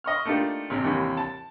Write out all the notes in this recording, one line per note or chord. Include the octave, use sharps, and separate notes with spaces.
D#5 C#6 F6
A3 A#3 D4 D#4 F4 G4
A1 C3
D#2 C3 E3 G3
A5